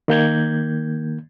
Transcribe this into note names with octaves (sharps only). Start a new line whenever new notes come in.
D#3 A#3 G6 G#6